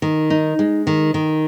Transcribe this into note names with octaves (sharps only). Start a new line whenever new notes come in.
D#3
D#4
G#3
D#3
D#3